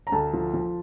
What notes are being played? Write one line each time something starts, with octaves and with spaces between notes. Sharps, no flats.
A#5
D2 A5
F3
F3